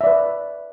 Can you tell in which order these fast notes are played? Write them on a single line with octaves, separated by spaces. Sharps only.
E5 D5 B4